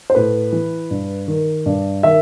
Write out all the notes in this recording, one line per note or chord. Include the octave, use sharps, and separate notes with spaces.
C5
A2 B4
E3
G2
D#3
G2
D#3 E5